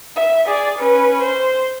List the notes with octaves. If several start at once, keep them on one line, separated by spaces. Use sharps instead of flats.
E5
G#4 D5
C#4 B4
C5